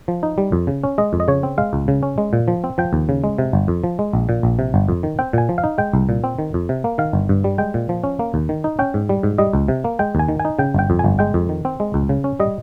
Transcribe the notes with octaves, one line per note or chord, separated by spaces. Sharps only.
F3
D#4
G3
F2
C#3
C#4
G#3 D#5
F2
D#5
C#3 C#5
C4
G#3 F5
C#2
C#3
C#4
G#3
A#2
F3
C4
F3 G5
D#2
C#3
G#3
C3
G1
F2
F3
G#3
A#1
A#2
A#1
C3
G1
F2
D#3
C4 G5
A#2 G#5
F3
F5
D#4
G#3 G5
C2
A#2
C4
D#3
F2
C3
A#3
D#3 F5
G1
G2
G3
G#3 G5
A#2
F3
C#4
A#3
D#2
D#3
D#4
C#4 G5
G#2
G3
G#2
G3 D#5
C#2
C3
A#3
G#3 G5
D#2 G#5
D#3
G#5
D#4
C#3 G5
G1 G5
F2
G#5
G1
G#3 G5
F2
D#3
C4
G#3
C#2
C#3
C#4
G3 D#5